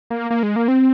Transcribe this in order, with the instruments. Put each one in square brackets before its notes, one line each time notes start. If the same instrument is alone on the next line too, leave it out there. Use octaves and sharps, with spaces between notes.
[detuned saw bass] A#3
A#3
G#3
A#3
C4